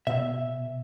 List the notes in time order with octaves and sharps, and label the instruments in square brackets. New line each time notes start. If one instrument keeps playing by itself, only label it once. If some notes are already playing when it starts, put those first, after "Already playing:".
[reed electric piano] B2 [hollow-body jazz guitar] E5